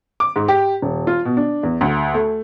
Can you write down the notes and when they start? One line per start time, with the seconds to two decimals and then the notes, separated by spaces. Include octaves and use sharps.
0.20 D6
0.36 G#2
0.48 G4
0.82 D#1
1.07 F4
1.25 B2
1.37 D4
1.63 E2
1.81 D2
2.14 A3